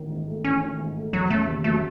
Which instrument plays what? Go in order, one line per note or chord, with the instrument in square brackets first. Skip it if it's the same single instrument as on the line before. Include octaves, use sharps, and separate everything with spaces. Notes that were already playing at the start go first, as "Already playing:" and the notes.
Already playing: [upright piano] A1 D#3
G#2
A3
[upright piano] A1 [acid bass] C#4
[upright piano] D#3
G#2
A3
[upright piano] E1 [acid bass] F#3
[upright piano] C#3 [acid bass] A3
[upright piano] D#2
[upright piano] F#3 [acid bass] A3